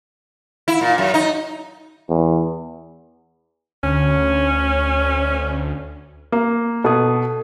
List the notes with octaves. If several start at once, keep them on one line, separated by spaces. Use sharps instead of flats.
E4
A#2
F#2
D#4
E2
D2 C#4
A#3
B2 A4 D#6